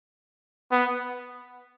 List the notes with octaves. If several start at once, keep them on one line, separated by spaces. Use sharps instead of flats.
B3